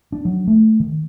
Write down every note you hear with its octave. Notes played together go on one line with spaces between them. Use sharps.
D4
F#3
A3
D#3